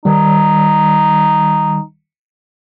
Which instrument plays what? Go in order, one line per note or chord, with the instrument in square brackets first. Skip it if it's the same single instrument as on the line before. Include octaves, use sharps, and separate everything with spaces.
[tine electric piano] D#3 G3 [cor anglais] D#4